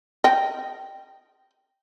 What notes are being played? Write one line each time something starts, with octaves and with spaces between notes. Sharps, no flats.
D#5 G5